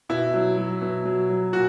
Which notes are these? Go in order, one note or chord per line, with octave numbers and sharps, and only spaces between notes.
B2 E4
F#3
F#3
B2
F#3
F#3
A#2 F#4